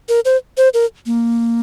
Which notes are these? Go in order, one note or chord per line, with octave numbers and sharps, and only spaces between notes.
A#4
C5
C5
A#4
A#3